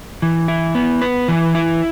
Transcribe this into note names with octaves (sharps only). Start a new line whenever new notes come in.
E3
E4
B3
B4
E3
E4